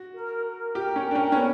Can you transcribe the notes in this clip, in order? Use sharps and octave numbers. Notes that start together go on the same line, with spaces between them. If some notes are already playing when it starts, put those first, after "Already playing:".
Already playing: F#4
A#4
A#4
G4 G5
C#4
A#4
D4
C#4
C#4
B3 C#5